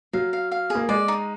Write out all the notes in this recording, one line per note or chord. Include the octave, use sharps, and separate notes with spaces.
F#3 F5
F5
F5
G#4
A#3
G#3 D5
D#4